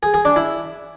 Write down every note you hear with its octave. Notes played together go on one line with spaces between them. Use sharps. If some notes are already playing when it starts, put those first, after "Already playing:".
G#4
G#4
D4
E4